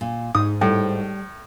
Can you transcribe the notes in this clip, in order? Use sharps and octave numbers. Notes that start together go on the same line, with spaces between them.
A#2
G#2 D#4 D#6
A2 G3